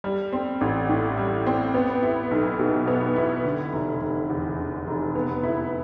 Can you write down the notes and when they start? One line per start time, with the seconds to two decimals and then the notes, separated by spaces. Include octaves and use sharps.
0.04 G3
0.32 C4
0.61 A1
0.89 A2
1.17 G3
1.46 C4
1.74 B3
2.03 E4
2.31 B1
2.59 B2
2.87 B3
3.16 E4
3.45 D3
3.73 F1
4.01 F1
4.29 E2
4.58 D3
4.87 F1
5.15 B3
5.43 E4